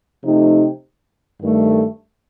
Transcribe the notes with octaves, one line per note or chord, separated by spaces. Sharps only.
C3 F3 A3 D#4 G4
G2 D#3 A3